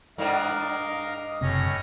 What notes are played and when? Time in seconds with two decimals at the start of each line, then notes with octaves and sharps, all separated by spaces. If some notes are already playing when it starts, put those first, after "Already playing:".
0.18 G2 D4 A#4 D#5 F5
1.41 F#1 A2 C3 C#4 A#6